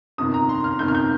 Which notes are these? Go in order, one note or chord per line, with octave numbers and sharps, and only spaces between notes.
G1 F2 C3 D#3 D#6
A#5
C6
F6
G1 F2 C3 D#3 G6
F6
G6